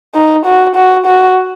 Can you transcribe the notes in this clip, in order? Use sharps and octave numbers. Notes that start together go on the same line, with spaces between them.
D#4
F#4
F#4
F#4